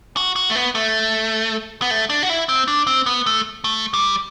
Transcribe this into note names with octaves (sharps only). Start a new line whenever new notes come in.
F#4
F#4
A3
B3
A3
B3
A3
D4
F#4
E4
C4
D4
C4
B3
A3
A3
G3